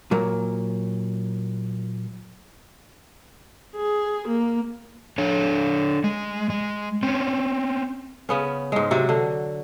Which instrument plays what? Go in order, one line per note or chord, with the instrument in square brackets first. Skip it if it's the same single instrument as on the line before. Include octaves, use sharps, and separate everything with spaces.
[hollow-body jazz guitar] A#2 F#3 A#3
[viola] G#4
A#3
[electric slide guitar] D4 A4 C#5
G#3
G#3
C4 C#4
[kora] C#3 B3 C#4
G#2 G#3
C3 F#3 F#4
D3